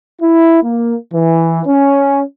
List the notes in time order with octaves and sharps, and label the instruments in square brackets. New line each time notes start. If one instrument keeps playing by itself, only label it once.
[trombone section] E4
A#3
E3
C#4